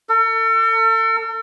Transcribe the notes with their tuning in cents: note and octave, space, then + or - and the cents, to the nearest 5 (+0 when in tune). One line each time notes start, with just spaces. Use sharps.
A4 +40